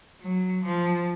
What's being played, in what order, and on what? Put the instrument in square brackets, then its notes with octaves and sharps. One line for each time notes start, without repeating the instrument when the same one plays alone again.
[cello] F#3
F3